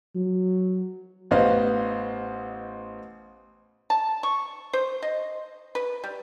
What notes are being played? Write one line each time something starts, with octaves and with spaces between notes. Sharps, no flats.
F#3
A1 B3 C5 D#5 F5
A5
C#6
C5
D#5
B4
G3